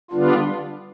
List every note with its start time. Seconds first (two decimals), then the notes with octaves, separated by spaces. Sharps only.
0.11 D3 G3 B3 D4 F4